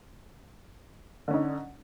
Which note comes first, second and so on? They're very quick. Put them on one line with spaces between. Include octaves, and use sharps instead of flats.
D3 C#4 D#4